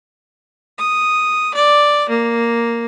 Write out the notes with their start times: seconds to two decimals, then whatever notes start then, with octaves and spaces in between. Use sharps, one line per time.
0.78 D#6
1.54 D5
2.09 A#3